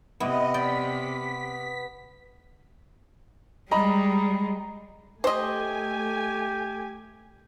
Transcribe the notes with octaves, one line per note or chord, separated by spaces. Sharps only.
C3 B3 E4 D#5
D5 G5 B5 B6
G3 G#3 D#5 A#5 B5
A3 G4 C5 D#5 G#5